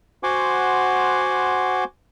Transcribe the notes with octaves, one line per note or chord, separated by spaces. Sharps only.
F#4 C5 F#5 G#5 C6 D6